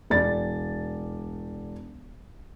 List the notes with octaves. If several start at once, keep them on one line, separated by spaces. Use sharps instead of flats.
E1 D5 A6